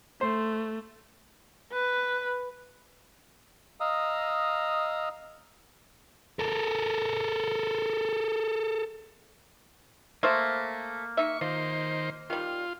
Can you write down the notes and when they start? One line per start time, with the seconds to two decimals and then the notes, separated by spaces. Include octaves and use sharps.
0.21 A3 C5
1.72 B4
3.80 D#5 F5 A#5 D#6 E6
6.39 A4 A#4
10.23 A3 A#3 C5 E5
11.17 D#4 E5 C#6
11.41 D#3 F3 C5
12.30 D#3 G3 F4